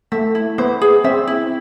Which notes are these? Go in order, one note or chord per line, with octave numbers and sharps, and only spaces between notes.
A3 E5
E4
B3 C5
G#4
C4 E5
E4